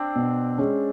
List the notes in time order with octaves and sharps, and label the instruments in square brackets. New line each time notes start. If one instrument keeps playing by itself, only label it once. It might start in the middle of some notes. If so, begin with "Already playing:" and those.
Already playing: [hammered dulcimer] C4 D4
[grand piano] B2
G#3 C#4